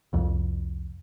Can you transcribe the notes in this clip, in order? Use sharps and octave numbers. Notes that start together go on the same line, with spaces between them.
C2 F2